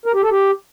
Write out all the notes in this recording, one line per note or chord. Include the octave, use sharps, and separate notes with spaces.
A#4
G4
A4
G4